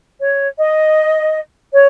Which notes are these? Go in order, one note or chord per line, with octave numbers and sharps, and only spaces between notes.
C#5
D#5
C#5